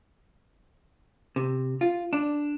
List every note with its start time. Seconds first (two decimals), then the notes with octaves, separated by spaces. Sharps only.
1.36 C3
1.81 F4
2.13 D4